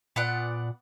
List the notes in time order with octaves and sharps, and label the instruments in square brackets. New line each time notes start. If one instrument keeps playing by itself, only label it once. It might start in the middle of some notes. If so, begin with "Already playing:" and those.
[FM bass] A#2 [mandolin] B3 D5 F#5